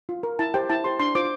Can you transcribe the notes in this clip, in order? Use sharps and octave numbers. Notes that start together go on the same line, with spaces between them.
F4
A#4
E4 A5
G4 C5 G5
E4 A5
G4 C5 C6
D4 C6
F4 C5 D6